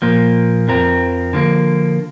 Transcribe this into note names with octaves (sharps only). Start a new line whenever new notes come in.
A#2 F3 A#3
F2 F3 C4 A#4
D3 F3 A#3